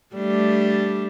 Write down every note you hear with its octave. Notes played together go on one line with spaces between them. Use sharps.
G3 A3 D4